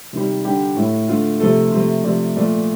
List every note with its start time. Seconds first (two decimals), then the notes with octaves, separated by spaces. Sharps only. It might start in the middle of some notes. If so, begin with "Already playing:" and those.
0.13 C3 D#3 G3
0.44 D3 G3 G4
0.76 A2 A3
1.08 D3 A3 F4
1.40 C3 F3 A3 A4
1.72 C3 F3 A3
2.04 C3 F3 A3 D5
2.35 A#2 F3 A3 D5